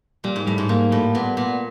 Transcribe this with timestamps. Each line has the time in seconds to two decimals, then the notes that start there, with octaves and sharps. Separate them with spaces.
0.24 A#2 G3
0.36 G#2
0.47 A2 G3
0.58 G#2
0.69 G#2 A#3
0.92 A2 G3
1.15 A#2 B3
1.37 A#2 B3